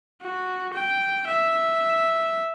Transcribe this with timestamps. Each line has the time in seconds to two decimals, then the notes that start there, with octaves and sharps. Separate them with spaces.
0.22 F#4
0.74 G5
1.27 E5